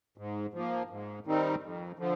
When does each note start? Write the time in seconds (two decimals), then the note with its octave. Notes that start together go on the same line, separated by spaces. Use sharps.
0.18 G#2
0.54 F3 A#3
0.90 G#2
1.26 D#3 G3 C4 D#4
1.63 F2
1.99 D3 F3